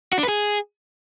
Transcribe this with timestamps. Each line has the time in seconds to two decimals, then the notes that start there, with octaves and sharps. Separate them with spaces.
0.13 F#4
0.18 D4
0.23 B4
0.29 G#4